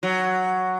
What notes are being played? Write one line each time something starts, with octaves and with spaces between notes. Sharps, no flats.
F#3